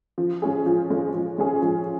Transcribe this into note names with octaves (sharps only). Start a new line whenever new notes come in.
F3
G#3 C#4 G#4
F3
G#3 C#4 G#4
F3
G#3 C#4 G#4
F3